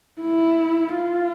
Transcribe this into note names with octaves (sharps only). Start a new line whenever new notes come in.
E4
F4